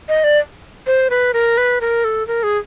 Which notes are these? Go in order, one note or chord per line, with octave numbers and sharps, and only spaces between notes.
D#5
D5
C5
B4
A#4
B4
A#4
A4
A#4
G#4